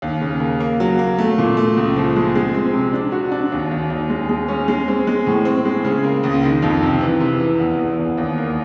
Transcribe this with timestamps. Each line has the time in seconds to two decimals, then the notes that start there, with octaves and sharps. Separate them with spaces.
0.02 D#2
0.21 C#3
0.40 A#3
0.60 A#3
0.80 F#3
0.99 A#3
1.18 A3
1.38 A#2
1.57 A3
1.77 C#2
1.96 F3
2.16 G#3
2.35 G#3
2.54 C4
2.73 C3
2.93 D4
3.12 F#4
3.31 D4
3.52 D#2
3.71 D#2
3.90 D#2
4.10 G#3
4.29 G#3
4.48 C#4
4.68 G#3
4.88 C4
5.07 G#3
5.26 A2
5.45 C4
5.65 G#3
5.84 C#3
6.04 A#3
6.23 C#2
6.43 D#3
6.62 F2
6.82 C3
7.01 E3
7.20 C3
7.40 E3
7.60 E2
7.79 E2
7.99 E2
8.18 D#2
8.38 A#3